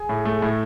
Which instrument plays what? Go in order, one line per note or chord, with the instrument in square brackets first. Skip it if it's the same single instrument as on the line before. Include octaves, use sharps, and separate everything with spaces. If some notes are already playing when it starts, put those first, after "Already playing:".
Already playing: [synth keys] G#4 G#5
[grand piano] A2
A3
A2